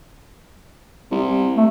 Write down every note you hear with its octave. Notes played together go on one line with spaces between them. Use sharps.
C2
A3